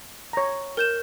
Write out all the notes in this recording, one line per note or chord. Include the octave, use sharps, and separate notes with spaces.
C#5 A#5
A#4 G6 E7